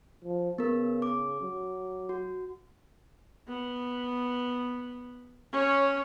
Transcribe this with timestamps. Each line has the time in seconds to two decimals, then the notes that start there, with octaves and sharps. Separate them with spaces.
0.24 F3
0.58 C#3 B3 A#4
1.02 D6
1.42 F#3
2.09 F#4
3.48 B3
5.52 C#4 C#5